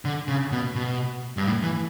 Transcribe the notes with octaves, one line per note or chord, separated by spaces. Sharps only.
D3
C#3
B2
B2
G2
A2
E3